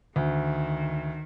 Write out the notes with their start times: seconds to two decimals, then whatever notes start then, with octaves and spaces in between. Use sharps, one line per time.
0.16 D2 D#3